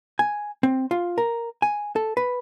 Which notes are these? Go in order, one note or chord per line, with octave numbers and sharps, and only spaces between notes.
G#5
C4
F4
A#4
G#5
A4
B4